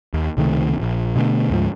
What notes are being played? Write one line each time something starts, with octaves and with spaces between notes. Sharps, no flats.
D#2
C#2 C3 D#3 A3
D#1 A#1
B2 D3 G3 A3
D2 G#2 F3